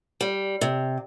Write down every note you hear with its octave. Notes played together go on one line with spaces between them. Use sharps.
G3
C3